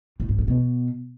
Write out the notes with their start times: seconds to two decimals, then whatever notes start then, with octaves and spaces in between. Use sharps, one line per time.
0.20 A2
0.29 G#2
0.38 C#3
0.48 B2